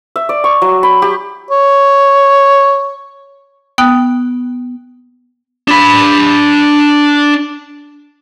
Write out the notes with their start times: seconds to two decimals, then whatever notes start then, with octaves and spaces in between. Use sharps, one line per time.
0.16 E5
0.29 D5
0.44 C#6
0.62 F#3
0.83 B5
1.02 G4
1.51 C#5
3.78 B3 G5 D#6 F#6
5.68 D4 B5